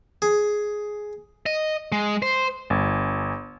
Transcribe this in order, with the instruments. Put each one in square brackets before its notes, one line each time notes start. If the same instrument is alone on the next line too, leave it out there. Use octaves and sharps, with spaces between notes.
[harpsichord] G#4
[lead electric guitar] D#5
G#3
C5
[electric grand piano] G1